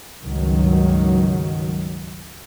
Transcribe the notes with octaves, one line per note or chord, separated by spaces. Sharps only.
C#2 G2 D#3 F#3